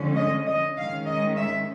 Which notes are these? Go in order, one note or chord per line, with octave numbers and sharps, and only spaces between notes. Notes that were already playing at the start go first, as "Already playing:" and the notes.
Already playing: D3 F3 G#3 C#4
D#5
D#5
D#3 G#3 C#4 F5
D#5
E5